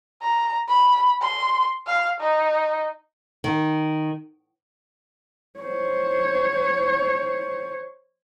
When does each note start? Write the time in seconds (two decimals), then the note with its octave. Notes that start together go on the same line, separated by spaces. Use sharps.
0.22 A#5
0.68 B5
1.21 C6
1.87 F5
2.21 D#4
3.44 D#3
5.60 C5 C#5